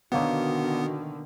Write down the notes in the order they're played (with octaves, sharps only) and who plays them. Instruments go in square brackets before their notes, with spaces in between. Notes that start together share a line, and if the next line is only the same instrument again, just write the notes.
[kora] B2 A#3 C#5 [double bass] D3 D#3 [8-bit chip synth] B3 [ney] F#4